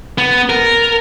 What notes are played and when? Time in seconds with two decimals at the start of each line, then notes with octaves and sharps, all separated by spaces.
0.18 B3
0.49 A#4